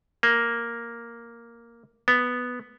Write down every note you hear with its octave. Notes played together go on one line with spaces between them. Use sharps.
A#3
B3